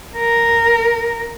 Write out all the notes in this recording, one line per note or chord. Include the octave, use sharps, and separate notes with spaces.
A#4